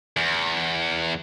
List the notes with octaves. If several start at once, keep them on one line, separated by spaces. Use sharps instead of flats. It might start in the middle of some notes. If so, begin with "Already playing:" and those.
E2